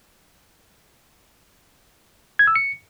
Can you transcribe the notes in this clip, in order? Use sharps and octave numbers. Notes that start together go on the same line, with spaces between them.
G#6
E6
C#7